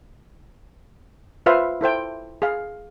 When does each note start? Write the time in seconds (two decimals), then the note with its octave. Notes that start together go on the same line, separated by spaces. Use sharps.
1.46 F4 B4 C5 E5 F5
1.81 E4 A4 C5 G5
2.42 G#4 F5